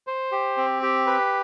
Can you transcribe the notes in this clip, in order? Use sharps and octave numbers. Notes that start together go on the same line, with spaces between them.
C5
G4
C4
G4
B4